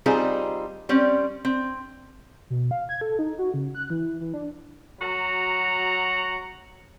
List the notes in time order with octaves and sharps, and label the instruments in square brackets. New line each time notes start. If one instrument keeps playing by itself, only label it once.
[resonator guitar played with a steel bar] G3 C4 D#4 F4 G#4
G3 C4 C#4
C4
[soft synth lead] B2
F5
G#6
A4
D#4
F#4
C#3
F#6
E3
E3
D4
[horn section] F#3 F#4 A#5